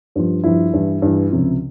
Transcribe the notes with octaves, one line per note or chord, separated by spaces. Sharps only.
G2 F3
G2 F3 E4
G2 E3
G2 E3
C#2 C3 F3